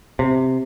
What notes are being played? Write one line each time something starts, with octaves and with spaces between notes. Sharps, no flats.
C3